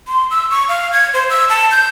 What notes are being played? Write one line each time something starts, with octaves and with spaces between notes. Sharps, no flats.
C6
E6
C#6
F5
G#6
C5
E6
A5
G6